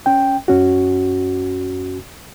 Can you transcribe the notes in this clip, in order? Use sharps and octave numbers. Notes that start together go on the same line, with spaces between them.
C#4 G5
F#2 C#4 F#4